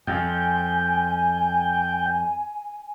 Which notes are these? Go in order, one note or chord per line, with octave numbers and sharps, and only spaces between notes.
F2 G5 G#5